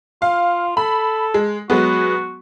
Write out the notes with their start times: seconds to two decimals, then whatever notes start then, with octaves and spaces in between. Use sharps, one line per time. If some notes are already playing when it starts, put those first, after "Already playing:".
0.22 F4 F5
0.77 A4 B5
1.34 G#3
1.70 F#3 G#3 B3 F#4